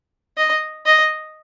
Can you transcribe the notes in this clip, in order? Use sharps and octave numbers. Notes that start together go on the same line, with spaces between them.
D#5
D#5